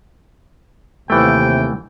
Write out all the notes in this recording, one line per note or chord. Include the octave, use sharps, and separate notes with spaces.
D#2 C3 E3 A3 G5